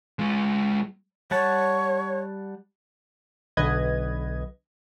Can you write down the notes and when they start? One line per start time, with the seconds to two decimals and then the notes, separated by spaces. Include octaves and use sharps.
0.19 G#3 F4
1.31 G3 C#5 F#5 A5
3.57 B1 D3 B4 D#5 G#6